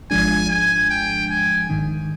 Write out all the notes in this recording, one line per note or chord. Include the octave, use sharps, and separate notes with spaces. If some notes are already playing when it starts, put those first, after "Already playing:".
G#1 G#2 F3 G#3 D4 G#5
G#5
G5
G#5
G#1 G#2 D#3